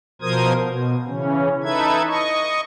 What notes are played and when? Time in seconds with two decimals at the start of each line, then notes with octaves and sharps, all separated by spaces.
0.22 B2 F3 A#4 C5 D#6 G#6
0.63 B2
1.07 C#3 E3 C#4
1.64 D#4 E4 A4 B4 E5 G#6
2.08 D#5 C#6